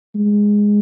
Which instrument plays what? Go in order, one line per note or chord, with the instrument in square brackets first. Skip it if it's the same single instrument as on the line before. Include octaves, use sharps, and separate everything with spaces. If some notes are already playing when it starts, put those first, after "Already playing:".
[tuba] G#3